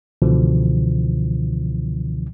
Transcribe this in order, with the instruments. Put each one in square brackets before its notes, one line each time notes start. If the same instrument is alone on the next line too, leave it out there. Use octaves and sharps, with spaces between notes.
[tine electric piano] C#2 B2 D3 E3 F3